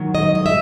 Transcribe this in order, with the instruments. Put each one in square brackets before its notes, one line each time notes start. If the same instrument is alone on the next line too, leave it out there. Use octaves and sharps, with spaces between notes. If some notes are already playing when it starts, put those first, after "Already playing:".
Already playing: [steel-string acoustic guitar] G#2 D#3 F#3
D#5
D#5
E5